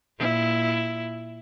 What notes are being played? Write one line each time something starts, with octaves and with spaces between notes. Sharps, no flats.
A#2 E4